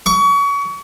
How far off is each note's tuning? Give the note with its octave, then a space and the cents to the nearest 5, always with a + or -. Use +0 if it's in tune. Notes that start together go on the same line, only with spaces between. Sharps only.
C#6 +30